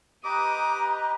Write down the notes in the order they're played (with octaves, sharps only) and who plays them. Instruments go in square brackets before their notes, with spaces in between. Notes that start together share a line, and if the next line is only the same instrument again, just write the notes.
[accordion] G4 B4 D#5 [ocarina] A#5 [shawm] D6 [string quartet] D#6